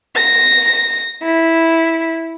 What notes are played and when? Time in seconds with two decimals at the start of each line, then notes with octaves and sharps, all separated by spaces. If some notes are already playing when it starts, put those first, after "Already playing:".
0.15 A#6
1.23 E4